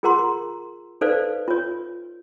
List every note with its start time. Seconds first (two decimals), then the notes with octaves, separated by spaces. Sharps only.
0.03 F4 G#4 A#4 F#5 A#5 C6
1.01 D#4 A4 B4 C5 D5 F5
1.48 F4 C#5